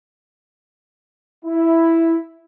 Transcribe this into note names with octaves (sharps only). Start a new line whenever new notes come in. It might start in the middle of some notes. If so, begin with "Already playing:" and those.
E4